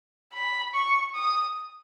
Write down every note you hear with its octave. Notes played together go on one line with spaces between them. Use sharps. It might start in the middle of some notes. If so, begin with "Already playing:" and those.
B5
C#6
D#6